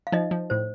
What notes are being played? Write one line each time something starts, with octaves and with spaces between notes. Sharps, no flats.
F5
F3 D#4 D#5
F3
A2 C5